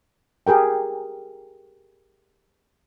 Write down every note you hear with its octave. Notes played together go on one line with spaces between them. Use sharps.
G4 G#4 A#4 G5